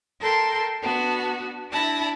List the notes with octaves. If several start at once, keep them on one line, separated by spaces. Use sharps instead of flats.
A4 A#4 G5 A5 C6
B3 D4 F#4
D4 E4 A5 B5 A#6